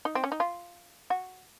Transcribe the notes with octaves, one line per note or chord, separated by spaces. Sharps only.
D#4
C4
C#4
D#4
F4
F#4